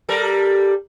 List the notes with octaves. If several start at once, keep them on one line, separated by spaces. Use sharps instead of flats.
G3 A4 A#4